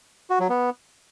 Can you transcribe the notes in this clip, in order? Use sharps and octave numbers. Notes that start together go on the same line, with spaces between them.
F#4
F#3
B3